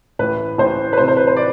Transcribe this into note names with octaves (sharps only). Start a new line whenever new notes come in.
A1 A2 E3 B4
A1 A2 E3 C5
B4
D2 C3 E3 C5
C5
B4
C5
D5